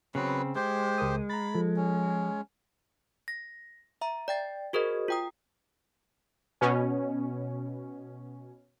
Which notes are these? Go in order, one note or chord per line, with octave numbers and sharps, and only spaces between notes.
C#3 F#3 B3 C4 B4
G#3 G4 C5
C#2 A#4 D#6
A#5 B5 A6
F3 A4
C#4
A#6
E5 A#5
D5 G5 A6
F#4 G#4 A#4 C5 D#5
F4 G5 D#6
B2 C#4